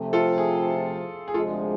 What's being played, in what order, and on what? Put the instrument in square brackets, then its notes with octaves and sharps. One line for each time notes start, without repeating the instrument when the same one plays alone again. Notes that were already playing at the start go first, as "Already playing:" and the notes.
Already playing: [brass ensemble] C3 F3 A3
[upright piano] F4 A4
G#4
G#4
[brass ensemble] D2 C3 F3 G#3 D4 [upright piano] F4 A4